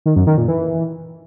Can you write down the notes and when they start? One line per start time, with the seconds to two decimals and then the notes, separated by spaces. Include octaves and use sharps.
0.06 D#3
0.16 F#2
0.27 D#3
0.38 A#2
0.48 E3